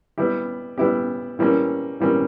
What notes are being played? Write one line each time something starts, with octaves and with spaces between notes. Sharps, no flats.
G3 B3 E4 G4
G3 B3 E4 G4
E3 G3 A#3 C#4
E3 G3 A#3 C#4